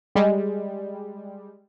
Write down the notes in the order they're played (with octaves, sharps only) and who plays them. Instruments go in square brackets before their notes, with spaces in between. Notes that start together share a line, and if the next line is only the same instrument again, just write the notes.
[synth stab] G3 G#3